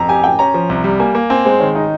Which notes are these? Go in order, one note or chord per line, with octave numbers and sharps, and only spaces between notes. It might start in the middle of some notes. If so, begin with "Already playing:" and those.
Already playing: F2 A#5
G4 G#5
G4 G5
C#4 A#5
F3
C2
G3
A#3 G#5
A#3
C4 G#5
G#3 C5
D#3 C#5
D#4 D#5